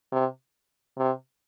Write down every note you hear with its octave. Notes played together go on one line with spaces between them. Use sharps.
C3
C3